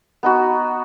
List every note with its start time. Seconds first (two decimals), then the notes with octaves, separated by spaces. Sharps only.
0.23 B3 D#4 F#4